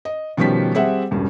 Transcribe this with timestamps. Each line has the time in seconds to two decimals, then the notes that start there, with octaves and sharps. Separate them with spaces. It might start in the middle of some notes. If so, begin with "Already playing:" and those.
0.05 D#5
0.37 B2 D#3 F3 G3 C#4 B6
0.75 G3 C4 G#4 E5 F#5
1.11 E1 G2 C#3